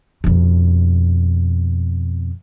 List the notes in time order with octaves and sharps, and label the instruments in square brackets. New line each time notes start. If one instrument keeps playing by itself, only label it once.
[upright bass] F2 B2